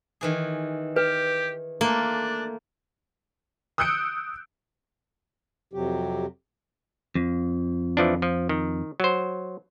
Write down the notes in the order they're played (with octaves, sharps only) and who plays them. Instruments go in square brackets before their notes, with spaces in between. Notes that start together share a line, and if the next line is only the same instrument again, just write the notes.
[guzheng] D#3 E3 G#4
[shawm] G4 [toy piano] B4
[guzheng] A3 F4 [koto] A#3 [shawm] D4
[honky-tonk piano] D#6 E6 F#6 G6 C#7 D7
[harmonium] F2 C3 F#3 G4
[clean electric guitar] F2
[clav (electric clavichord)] E3 F3 D4
F3
D#3
F#3 C5